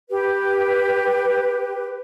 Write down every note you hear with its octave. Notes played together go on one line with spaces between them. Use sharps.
G4 B4